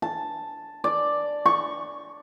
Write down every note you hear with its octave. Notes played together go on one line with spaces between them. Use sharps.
A5
D5
C#6